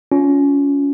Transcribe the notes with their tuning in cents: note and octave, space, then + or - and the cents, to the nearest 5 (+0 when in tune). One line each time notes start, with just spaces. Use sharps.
C#4 +25 F4 +15